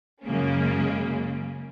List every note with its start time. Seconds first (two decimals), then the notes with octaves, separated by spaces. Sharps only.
0.24 F#2 C#3 G#3 A#3 C#4